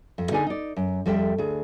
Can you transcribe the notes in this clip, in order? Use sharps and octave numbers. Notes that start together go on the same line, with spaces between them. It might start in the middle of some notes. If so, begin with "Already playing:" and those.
F2
D3 D#4 G#4 D5 G#5
D#4 D5
F#2
F2 G3 A4 E5 G5
D2 G#4